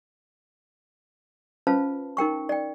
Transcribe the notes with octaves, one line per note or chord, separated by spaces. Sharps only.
C#4 F4 B4 C5 F5 A5
D#4 A#4 G5 C#6
D5 G5